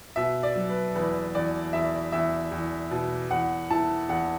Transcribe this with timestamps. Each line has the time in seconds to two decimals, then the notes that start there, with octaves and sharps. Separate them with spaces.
0.16 B2 E5
0.43 D5
0.56 F#3
0.69 B4
0.95 E2 B4
1.35 E2 D5
1.73 E2 E5
2.12 E2 E5
2.52 E2
2.91 B2
3.30 E2 F#5
3.70 E4 A5
4.09 E2 F#5